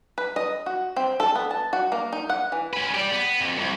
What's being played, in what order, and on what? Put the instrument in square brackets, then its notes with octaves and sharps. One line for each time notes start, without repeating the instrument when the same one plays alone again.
[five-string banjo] B4
D#5
F#4
C4
A4
B3
A5
F#4
A#3
D#4
F#5
E3
[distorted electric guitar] C#4 B4
G4 D5
B3
F2
C2